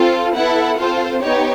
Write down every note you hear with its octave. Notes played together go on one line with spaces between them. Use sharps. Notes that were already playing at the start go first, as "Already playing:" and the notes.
Already playing: C4 F4 A4
B3 E4 A4 F#5
C4 F4 A4 C5
B3 D#4 G4 C#5